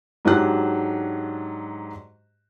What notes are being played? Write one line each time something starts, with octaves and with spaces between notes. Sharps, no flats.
G#2 F#3 D4 G4 F#6